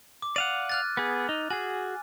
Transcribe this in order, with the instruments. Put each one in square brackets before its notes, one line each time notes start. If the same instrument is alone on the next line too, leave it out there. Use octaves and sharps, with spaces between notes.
[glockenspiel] D6
[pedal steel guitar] D5 F5 F#5 [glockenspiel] D#7
[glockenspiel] F6 F#6 A6
[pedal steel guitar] B3 G#4
D#4
[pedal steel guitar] F#4 G#4 [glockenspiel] G#5